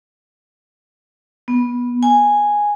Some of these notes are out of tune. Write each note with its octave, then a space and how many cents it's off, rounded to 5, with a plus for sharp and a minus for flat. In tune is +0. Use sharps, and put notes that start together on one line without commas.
B3 -15
G#5 -5